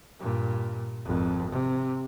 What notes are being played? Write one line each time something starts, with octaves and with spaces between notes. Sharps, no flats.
G2 A#2
G#1 F2
C3